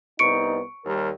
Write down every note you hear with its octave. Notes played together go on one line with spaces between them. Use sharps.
C2 B3 D#4 C#6 C#7 D7
D#2 G3 A#4